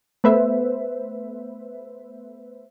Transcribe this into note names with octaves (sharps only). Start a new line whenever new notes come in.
A3 B3 B4 C5 E5